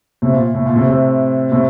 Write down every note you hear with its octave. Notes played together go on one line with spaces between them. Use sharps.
A2 C3
A#2
A2
A#2
A2 C3
A2 C3
A2 C3